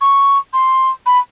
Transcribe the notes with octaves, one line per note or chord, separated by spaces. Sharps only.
C#6
C6
B5